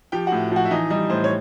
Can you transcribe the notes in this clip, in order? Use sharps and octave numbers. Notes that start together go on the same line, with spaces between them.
F3 G4 G5
A2 F#4 F#5
F3 F#4 F#5
E5
E3 D#4 D#5
G3 D#4 D#5
A2 C5
C#5